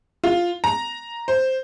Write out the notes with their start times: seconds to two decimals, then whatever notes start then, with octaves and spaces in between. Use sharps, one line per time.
0.24 F4
0.64 A#5
1.28 C5